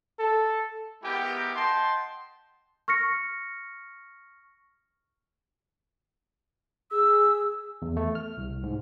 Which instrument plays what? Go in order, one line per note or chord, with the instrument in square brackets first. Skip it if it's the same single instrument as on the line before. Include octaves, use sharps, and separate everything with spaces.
[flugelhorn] A4
[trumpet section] G#3 B3 E4 G4 A#4 G5
D#5 F#5 G5 A5 C6
[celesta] C#6 F6 A#6 C#7
[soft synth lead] G#4 [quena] E6
[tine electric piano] E2
A3
F6
C2
G#2